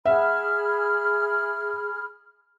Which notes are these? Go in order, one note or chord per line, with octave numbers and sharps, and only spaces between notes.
G#4 E5 F#5 B5 F6